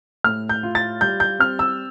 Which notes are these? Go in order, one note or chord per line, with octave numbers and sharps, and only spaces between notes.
A2 F6
G6
F4
A6
G3 G6
G6
C4 F6
E6